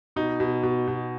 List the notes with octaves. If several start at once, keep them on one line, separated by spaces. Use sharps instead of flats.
B2 D#4
B2
B2
B2